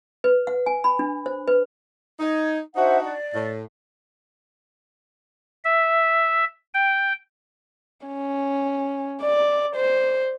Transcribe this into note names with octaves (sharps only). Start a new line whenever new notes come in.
B4
F#5
G#5
B5
D4
C5
B4
D#4 G#6
D4 D#4 F#4 C5 E5 F#5
D5
A2
E5
G5
C#4
D5
C5